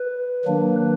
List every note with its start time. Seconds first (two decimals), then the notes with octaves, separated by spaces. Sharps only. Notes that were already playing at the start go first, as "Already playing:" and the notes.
Already playing: B4
0.45 D#3 F#3 A#3 D4